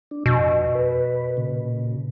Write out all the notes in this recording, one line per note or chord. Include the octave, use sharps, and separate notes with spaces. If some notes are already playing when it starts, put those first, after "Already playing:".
D4
F2 B2
B4
A#2 C#3